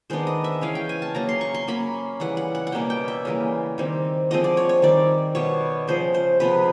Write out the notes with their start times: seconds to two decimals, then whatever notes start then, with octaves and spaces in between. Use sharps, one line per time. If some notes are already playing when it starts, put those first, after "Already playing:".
0.10 D#3 G#3 B3 D4 C5
0.27 D#5
0.44 E5
0.61 C#3 E3 G#3 C#4 F5
0.75 G5
0.89 G#5
1.02 A5
1.14 C#3 F#3 A#3 A#5
1.29 C6
1.41 C#6
1.54 C6
1.68 F#3 A#3 C#4 B5
2.20 C#3 E3 G3 F#5
2.37 F#5
2.55 F#5
2.67 F#5
2.72 B2 G3 A#3 C#4 G5
2.90 G5
3.08 E5
3.25 C#3 E3 G3 A#3
3.78 D#3 G3 C4
4.31 D3 F3 G#3 C4 D#5
4.44 D5
4.57 C#5
4.69 C#5
4.82 D#3 G3 C4 D5
5.35 B2 G3 B3 C#5
5.88 C#3 F3 G#3 C5
6.14 C5
6.40 C3 F3 G#3 B3 B4